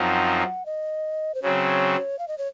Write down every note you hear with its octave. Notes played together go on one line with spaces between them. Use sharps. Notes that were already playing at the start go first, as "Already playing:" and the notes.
Already playing: F#2 F3 C4 D#4 F#5
D#5
C5
C#3 F#3 C4 C#5
F5
D#5
C#5